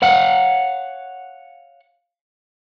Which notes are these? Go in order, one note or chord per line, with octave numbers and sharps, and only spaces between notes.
C#5 F5 F#5